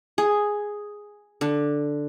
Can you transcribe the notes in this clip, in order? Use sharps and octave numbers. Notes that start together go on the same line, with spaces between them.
G#4
D3